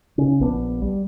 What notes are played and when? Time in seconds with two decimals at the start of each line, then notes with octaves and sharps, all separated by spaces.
0.18 C#3 C#4
0.40 A#1 B3 C#4 D4
0.82 G3